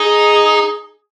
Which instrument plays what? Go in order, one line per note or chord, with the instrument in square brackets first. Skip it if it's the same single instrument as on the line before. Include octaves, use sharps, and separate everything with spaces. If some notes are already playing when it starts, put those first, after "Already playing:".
Already playing: [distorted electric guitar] D#4 [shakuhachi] G#4